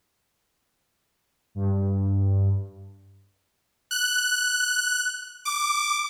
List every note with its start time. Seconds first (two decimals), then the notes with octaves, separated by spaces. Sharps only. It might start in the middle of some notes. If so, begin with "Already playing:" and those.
1.55 G2
3.91 F#6
5.45 D6